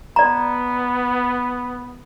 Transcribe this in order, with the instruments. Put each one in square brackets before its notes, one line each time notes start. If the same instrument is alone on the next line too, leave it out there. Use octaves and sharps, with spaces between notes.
[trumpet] B3 [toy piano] D5 A#5